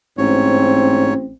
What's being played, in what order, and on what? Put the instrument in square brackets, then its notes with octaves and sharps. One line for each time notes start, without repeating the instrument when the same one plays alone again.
[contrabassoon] A1 [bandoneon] G#2 C#5 [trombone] C4